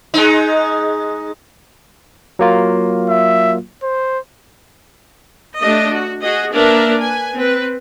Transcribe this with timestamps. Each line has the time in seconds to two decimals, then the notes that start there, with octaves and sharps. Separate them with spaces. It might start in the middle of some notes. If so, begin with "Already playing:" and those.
0.14 G#3 D#4
2.39 F#3 A#3 F4
3.09 E5
3.83 C5
5.60 A3 D4 G4 D#5
5.91 F#4
6.22 F#4 G#4 D#5
6.52 A#3 D4 A#4 B4 D5 E5
6.98 B4 G#5
7.35 C4 B4